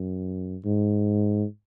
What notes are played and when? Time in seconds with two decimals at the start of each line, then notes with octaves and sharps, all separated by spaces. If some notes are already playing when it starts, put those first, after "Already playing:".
Already playing: F#2
0.65 G#2